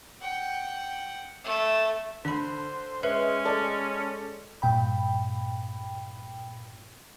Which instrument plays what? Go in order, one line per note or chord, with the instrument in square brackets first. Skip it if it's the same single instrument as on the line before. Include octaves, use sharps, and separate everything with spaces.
[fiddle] F#5 G5
A3
[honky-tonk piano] D3 [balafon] D4 B5 [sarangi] C5
[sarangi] G#3 [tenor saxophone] C#4 [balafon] B4 E5
[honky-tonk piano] A4 D5
[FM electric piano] G2 A#2 G5 B5